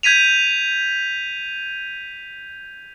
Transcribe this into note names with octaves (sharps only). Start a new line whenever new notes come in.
G6 G#6 B6 D#7 F7